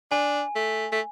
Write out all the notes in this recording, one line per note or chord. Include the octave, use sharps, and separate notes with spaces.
D4 G#5
A3
A3